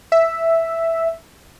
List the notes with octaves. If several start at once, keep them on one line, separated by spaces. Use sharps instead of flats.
E5